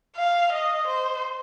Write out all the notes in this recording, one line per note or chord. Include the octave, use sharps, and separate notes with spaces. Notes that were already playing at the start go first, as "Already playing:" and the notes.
F5
D#5
C5